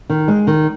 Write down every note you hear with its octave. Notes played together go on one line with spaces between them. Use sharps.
D#3
G#3
D#3